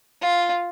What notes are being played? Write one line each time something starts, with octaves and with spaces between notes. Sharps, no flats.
F4